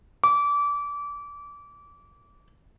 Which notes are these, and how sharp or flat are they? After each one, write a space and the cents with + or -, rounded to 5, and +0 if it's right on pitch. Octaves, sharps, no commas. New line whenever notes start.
D6 -25